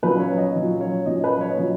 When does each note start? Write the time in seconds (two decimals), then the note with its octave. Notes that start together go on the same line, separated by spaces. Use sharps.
0.03 A#2 F#3 C#4 B4
0.20 C#5
0.38 D#5
0.55 A#2 F#3 C#4
0.81 C#5
1.06 A#2 F#3 C#4 D#5
1.24 B4
1.41 C#5
1.50 D#5
1.58 A#2 F#3 C#4 C#5